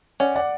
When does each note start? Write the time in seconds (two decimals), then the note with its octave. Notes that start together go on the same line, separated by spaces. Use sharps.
0.20 C#4 D5 F#5
0.36 D5 F#5